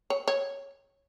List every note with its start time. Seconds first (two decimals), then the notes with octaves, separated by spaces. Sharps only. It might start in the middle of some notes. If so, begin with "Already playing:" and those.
0.10 C#5
0.28 C#5